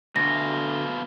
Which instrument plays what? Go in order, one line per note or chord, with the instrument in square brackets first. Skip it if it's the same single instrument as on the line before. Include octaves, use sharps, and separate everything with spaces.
[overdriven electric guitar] D2 [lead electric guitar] B2 F4 [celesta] A#6